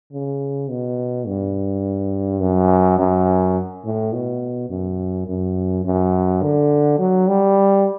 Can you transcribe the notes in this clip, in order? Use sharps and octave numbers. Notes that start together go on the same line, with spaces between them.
C#3
B2
G2
F#2
F#2
A2
B2
F#2
F#2
F#2
D3
F#3
G3